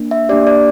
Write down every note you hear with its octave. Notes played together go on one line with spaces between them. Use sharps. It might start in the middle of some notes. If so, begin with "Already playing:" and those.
Already playing: A#3 D4
E5
A#3 D4 G4 D5
D5